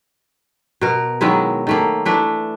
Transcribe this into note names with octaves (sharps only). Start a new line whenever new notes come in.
B2 A#4
D#3 F#3 G#3 E4
D#3 A3 A#3
E3 A3 D4